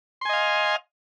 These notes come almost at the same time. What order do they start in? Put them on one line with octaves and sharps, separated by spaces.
C6 G#5 D#5 F5